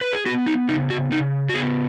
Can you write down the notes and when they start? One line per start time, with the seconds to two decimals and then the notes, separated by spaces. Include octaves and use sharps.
0.01 B4
0.13 G#4
0.26 B3 F#4
0.46 D#4
0.69 C#3 D#4
0.90 F#4
1.11 C#3 D#4
1.49 F#4
1.54 B3 G#4